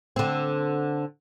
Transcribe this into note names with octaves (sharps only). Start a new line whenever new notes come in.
D3 C4